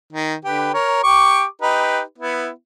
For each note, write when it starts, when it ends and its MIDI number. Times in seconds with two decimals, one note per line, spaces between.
0.13 0.35 51
0.45 0.71 50
0.45 0.71 67
0.45 0.71 71
0.74 1.03 70
0.74 1.03 73
1.03 1.44 67
1.03 1.44 85
1.03 1.44 86
1.62 2.01 63
1.62 2.01 67
1.62 2.01 71
2.19 2.49 59
2.19 2.49 64